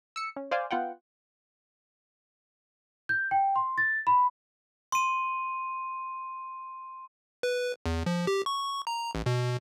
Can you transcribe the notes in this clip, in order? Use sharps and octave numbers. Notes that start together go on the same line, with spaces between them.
E6 C#7
C#4
C5 D5 F5 G#5
B3 F4 F#5 G5
G6
G5
C6
A6
B5
C6 D#7
B4
E2
F3
G4
C#6
A#5
A1
B2